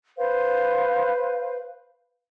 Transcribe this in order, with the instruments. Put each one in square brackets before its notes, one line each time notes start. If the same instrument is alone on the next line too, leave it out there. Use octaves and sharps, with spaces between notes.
[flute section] B4 C5 F5